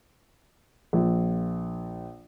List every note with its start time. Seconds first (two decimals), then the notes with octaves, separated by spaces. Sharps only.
0.93 A#1